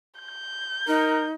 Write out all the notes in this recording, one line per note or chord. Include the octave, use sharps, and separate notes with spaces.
G6
D#4 A#4